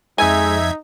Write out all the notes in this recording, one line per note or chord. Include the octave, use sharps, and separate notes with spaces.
F2 G#3 D#4 E5 G#5 G#6